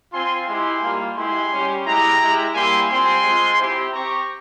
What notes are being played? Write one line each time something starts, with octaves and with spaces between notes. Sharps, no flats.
C4 F4 G#5 C6
G#3 E4 G4 G#5 C6
G3 A#3 F4
G#3 E4 G4 G#5 C6
G3 C#4 G4
G#3 E4 G4 G5 A#5
G#3 E4 G4
G3 A#3 E4 G4 G#5 C6
G3 C4 F4 G#5 C6
G#3 C4 F4
C4 E4 G4
C4 G4 A#5 C#6